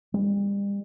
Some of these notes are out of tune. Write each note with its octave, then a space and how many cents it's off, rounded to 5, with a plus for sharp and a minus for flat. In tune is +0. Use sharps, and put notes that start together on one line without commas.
G3 +40